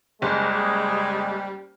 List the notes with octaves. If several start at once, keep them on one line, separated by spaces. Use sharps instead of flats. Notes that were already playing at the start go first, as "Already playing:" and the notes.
F#1 G3 G#3